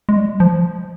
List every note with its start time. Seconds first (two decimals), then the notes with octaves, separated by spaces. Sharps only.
0.09 G#3
0.17 G3
0.40 F3